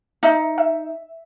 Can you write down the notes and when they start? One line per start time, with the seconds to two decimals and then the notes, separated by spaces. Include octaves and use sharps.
0.23 D#4 E5
0.58 E5